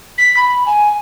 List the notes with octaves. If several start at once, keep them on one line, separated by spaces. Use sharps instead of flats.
B6
B5
G#5